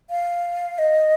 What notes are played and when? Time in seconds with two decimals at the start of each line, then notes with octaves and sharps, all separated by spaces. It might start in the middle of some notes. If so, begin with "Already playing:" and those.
0.10 F5
0.78 D#5